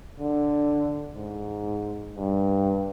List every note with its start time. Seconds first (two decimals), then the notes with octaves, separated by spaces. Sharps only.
0.20 D3
1.14 G#2
2.16 G2